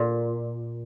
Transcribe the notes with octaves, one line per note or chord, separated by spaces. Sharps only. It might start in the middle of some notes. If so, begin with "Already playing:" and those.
Already playing: A#2